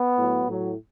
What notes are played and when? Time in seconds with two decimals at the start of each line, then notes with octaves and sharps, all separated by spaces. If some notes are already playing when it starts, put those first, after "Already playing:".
Already playing: B3
0.16 A2 F#3
0.46 A2 F#3